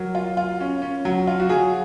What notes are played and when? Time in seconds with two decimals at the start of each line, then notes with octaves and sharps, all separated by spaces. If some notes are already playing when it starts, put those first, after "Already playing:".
Already playing: F#3 A#4
0.15 F4
0.37 F4
0.60 C#4
0.82 C#4
1.05 F#3
1.27 F4
1.40 F#4
1.49 F#3 G#4